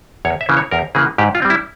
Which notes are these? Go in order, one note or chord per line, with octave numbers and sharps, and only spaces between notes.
E2 C#5
E5
C#3 E3 A#3
C#5
E2 A#4
C#3 E3 A#3 G#4
G#2 G4
F4
G3 C4
E4